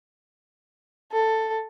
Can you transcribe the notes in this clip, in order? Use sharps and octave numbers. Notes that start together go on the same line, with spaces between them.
A4